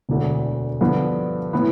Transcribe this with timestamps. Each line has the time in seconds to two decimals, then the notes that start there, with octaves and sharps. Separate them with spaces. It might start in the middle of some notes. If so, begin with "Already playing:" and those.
0.09 E1 D2 D3
0.81 G2 D3 F3 B3
1.53 A2 E3 B3